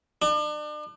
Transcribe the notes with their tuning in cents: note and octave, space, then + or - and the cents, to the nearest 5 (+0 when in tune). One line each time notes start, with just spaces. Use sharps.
D4 +40